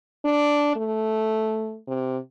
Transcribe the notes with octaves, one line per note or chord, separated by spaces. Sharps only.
D4
A3
C3